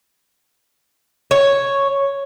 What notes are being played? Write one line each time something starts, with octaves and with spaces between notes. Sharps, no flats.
C#5